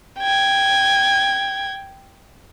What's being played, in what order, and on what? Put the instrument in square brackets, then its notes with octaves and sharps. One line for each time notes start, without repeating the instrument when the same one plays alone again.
[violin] G5 G#6